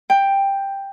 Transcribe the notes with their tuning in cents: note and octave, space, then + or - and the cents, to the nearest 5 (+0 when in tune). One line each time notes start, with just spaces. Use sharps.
G5 +10